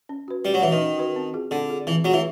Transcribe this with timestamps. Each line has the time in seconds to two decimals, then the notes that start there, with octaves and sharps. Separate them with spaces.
0.09 C#4
0.28 F#4 B4
0.45 G3 C#4
0.54 F#3
0.62 E3 F#4 B4
0.71 D#3
0.80 C#4
0.98 F#4 B4
1.16 C4
1.34 F4 G#4
1.51 D3 C4
1.69 F4 G#4
1.87 E3 C4
2.04 F#3 F4 G#4
2.13 E3